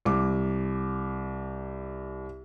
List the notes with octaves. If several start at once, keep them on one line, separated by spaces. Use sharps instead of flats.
C2 D6